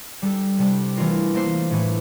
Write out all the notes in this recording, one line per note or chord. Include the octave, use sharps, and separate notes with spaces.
G3 D4 A4
C3 G3 D4
E3 A3 D4 F4 A#4
A#3 D4 A4 C5
A2 E3 A3